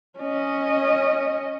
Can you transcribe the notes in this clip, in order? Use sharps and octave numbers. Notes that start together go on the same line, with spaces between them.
C#4 D#5